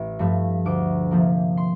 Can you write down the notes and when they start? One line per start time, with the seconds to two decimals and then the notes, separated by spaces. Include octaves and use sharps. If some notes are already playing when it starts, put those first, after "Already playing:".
Already playing: A1
0.19 G2 F3 A3
0.65 D2 D6
1.11 C3 F3 A#3
1.57 C6